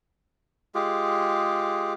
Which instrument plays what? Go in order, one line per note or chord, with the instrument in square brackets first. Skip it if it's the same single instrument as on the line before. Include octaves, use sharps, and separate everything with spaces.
[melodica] G#3 F4 G4 G#4